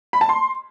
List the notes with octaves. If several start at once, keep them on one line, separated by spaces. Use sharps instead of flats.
B5
A5
C6